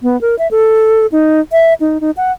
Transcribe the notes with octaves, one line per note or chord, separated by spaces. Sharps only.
B3
A#4
E5
A4
D#4
E5
D#4
D#4
F#5